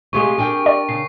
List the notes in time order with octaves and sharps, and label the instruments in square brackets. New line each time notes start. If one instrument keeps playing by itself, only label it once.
[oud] C3 G#3 G#4 [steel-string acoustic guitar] A3 G4 F5 [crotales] C#6
[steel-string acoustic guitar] D4 A#4 G5 [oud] G4 G#4
[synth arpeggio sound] D5 [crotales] C#6
[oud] C#3 [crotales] C7